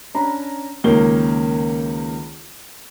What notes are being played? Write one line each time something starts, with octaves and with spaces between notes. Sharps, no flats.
C#4 D4 A#5 B5
C#2 D#3 A#3 C#4 G7